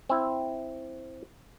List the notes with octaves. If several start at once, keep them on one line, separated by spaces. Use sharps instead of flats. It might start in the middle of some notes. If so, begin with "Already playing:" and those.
C4 E4